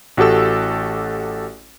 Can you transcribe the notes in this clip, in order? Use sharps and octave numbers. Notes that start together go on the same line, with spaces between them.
A1 F#4 G4 A4 E6